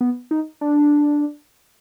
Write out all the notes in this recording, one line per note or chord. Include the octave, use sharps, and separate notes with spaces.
B3
D#4
D4